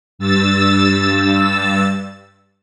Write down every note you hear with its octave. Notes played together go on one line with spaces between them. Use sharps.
G2 E6 A6